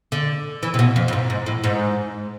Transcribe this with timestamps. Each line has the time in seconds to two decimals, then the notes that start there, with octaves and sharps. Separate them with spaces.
0.12 D3
0.63 E3
0.74 C3
0.79 B2
0.96 F2
1.08 F2
1.13 G#2
1.30 G#2
1.46 A2
1.64 G#2